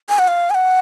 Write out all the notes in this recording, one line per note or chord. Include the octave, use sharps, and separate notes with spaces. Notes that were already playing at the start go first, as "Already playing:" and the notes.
G#5
F#5
F5
G#5
F#5